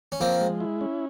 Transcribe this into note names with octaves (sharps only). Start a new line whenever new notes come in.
C#4
F3 A#3 C4
G#3
E4
C#4